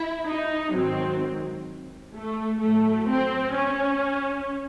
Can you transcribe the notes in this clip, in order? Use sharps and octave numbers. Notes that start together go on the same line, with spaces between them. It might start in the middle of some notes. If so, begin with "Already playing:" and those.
Already playing: E4
D#4
G#2 D#3 F#3 C4
A3
A2 F#3 A3
C4
C#4